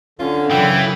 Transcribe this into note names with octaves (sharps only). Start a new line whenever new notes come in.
D3 C#4 F4
F#2 C#3 E3 G5